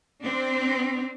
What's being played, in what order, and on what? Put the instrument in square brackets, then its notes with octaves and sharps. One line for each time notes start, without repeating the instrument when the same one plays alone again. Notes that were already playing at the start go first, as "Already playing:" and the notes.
[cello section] C4 D4